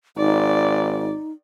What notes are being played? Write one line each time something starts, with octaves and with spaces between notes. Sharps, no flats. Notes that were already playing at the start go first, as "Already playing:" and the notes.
G#1 D#4 D5